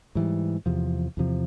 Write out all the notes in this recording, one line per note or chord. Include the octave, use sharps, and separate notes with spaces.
G#2 E3 G3
E2 C3 F3
E2 C3 F3